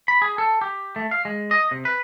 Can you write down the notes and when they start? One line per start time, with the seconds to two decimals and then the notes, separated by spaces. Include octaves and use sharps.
0.08 B5
0.22 G#4
0.38 A4
0.61 G4
0.96 A3
1.11 F5
1.25 G#3
1.51 D#5
1.71 C3
1.85 B4